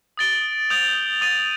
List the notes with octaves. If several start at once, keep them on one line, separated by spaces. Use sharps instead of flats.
D#6 A6 D7 G7
D#6 G6 D7 F7
D#6 A6 D#7